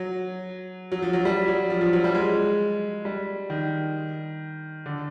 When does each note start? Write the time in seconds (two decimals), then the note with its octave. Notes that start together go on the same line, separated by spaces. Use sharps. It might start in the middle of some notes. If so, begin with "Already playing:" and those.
Already playing: F#3
0.92 F#3
1.02 F3
1.13 F#3
1.25 G3
1.48 F#3
1.70 F3
1.81 F3
1.93 F#3
2.04 G3
2.15 G#3
3.05 G3
3.50 D#3
4.86 D3